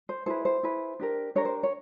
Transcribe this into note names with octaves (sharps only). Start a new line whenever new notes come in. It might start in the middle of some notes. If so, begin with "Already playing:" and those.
C5
E4 G#4 B4 C5
C5
E4 G#4 B4
D4 G4 A#4
D4 G4 A#4 C#5
C5
C#5